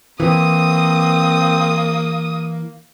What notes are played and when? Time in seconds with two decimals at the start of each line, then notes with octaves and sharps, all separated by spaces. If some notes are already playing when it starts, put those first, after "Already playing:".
0.20 E3 A#3 C4 D#6